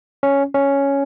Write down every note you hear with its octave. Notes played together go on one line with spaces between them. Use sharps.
C#4
C#4